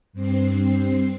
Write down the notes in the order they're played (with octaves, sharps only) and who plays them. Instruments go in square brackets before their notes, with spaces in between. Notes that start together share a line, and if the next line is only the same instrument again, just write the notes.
[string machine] G2 C4 C7